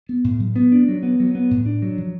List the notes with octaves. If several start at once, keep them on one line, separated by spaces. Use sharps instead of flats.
B3
A2
F#3
B3
D4
F#3
B3
F#3
B3
A2
D4
F#3
F3